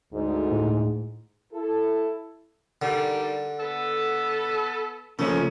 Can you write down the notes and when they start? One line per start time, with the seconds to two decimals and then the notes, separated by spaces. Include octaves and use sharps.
0.13 D2 G#2
0.51 A2
1.53 E4 A4
2.82 D3 D#3 G3
3.59 B3 A4
5.19 A#2 C#3 F3 A3 C#4